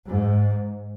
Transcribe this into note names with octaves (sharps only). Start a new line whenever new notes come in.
G#2